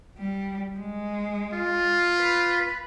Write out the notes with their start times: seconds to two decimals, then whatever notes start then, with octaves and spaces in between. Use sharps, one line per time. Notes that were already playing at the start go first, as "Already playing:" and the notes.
0.18 G3
0.78 G#3
1.54 F4
2.19 B4